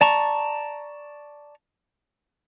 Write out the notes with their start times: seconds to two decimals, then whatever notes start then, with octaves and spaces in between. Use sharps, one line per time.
0.01 D5 A5 A#5 C#6